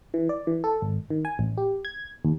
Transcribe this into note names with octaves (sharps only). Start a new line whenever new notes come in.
E3
D5
E3
A4
G#1
D#3
G#5
A1
G4
G#6
D#2